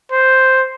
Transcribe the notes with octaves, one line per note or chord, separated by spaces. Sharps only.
C5